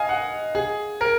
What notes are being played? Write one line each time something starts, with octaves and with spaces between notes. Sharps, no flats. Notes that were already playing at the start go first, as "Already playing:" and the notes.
Already playing: D#5 F5 G#5
F#5
G#4
A#4